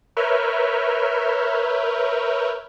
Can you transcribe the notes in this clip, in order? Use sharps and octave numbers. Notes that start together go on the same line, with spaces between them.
A#4 B4 C#5 E5 F6 G6